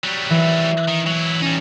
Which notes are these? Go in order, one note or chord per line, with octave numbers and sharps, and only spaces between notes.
F#3 G3
E3
D#3
F#3 E4
G3 C#4 D#4